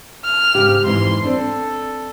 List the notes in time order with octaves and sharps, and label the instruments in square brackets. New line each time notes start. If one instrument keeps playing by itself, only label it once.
[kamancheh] F6
[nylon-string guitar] G#2 C#3 G4
[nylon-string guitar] F2 G#2 E3 [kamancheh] C6
[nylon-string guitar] C4 D4 [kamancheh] A4